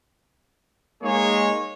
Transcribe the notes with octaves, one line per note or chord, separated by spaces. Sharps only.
G#3 A#3 D#4 G#4 C#5